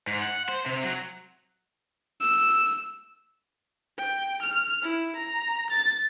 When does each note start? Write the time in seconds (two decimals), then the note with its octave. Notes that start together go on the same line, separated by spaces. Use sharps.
0.07 G#2
0.22 F#5
0.49 C5
0.66 C3
0.83 F#3
2.21 E6
3.98 G5
4.42 F6
4.82 E4
5.16 A#5
5.70 A6